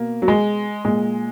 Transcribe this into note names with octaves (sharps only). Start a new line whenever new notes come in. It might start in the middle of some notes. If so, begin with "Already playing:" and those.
Already playing: B2 A#3
F#3
G#3
A#2 G#3